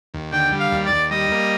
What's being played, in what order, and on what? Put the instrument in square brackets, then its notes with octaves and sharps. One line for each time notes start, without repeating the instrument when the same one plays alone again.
[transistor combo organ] D#2
[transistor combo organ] D3 [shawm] G5
[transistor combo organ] G3
[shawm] F5
[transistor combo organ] D#2
[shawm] D5
[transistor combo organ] D#2
[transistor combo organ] G3 [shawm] D#5
[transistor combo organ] A#3